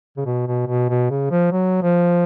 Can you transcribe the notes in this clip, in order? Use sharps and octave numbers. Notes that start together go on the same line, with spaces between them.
C#3
B2
B2
B2
B2
C#3
F3
F#3
F3